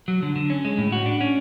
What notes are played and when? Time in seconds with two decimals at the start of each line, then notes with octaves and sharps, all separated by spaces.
0.08 F#3
0.22 D3
0.36 D3
0.50 C#4
0.65 G#3
0.78 A2
0.92 F#4
1.06 D4
1.21 C#4